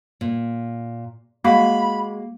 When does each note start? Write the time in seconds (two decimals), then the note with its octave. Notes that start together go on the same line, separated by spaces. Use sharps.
0.21 A#2
1.44 G#3 A#3 F#4 F5 B5